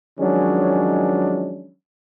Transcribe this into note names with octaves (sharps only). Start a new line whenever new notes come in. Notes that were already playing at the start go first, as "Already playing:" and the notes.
D#3 F3 F#3 G#3 C#4 D4